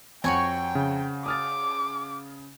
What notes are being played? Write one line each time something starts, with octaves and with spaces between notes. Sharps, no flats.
F2 F#4 C#5 G5 G#5
C#3
D6 D#6 F6 A6